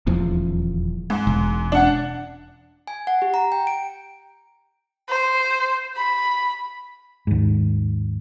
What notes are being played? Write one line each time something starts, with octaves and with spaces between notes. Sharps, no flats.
D#1 E2 F3
G#2
E1
D4 F#5
G#5
F#5
G4
A#5
G5
D7
C5
B5
D#2 G#2